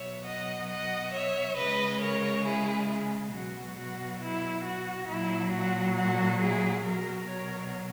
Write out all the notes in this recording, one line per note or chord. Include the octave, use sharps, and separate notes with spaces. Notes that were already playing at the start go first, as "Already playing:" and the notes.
Already playing: B2 F#3 C#5 E5
D#5 F#5
D#5 F#5
C#5 E5
C#3 G#3 B4 D#5
A#4 C#5
E4 G#4
B2 F#3 F#4
F#4
E4
F#4
A#2 F#3 E4
F#4
F#4
E4 G#4
B2 F#3 F#4 A#4
A#4 C#5